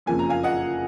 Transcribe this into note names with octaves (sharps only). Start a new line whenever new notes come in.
F#1 F2 F3 A#3 C#4 G#5
A#5
F5 G#5
D#5 F#5